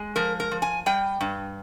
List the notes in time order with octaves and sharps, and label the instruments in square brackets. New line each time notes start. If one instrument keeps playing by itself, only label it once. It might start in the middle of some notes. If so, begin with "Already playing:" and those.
Already playing: [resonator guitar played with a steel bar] G#3
F3 A#4
A#4
F3
G#5
G3 G5
G2